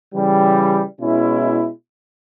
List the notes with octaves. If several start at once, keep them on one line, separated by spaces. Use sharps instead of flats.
C#3 E3 G3
B2 G#3 C#4 E4